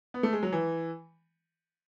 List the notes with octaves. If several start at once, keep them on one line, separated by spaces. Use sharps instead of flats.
B3
A3
G#3
F#3
E3